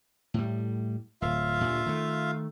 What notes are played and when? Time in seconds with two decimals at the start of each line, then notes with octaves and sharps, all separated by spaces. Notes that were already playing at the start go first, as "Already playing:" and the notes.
0.34 A2 G3
1.22 D1 F4 E5 F5
1.61 D2 G2 A#2
1.86 D#3 A3